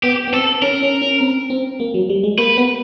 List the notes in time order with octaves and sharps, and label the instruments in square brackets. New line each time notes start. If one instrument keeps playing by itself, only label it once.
[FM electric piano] B3 [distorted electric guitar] G4
[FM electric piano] B3
[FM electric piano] C4 [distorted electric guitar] A4
[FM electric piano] C#4 [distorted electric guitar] A#4
[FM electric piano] C#4
C#4
C4
C4
A#3
F#3
G3
G#3
[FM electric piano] A#3 [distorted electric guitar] B4
[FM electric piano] B3